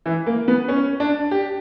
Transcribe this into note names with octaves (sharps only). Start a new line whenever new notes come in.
E3
A#3
B3
C#4
D4
G4